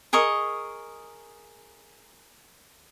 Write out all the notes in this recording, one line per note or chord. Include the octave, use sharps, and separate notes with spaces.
G#4 A#4 D#5 C#6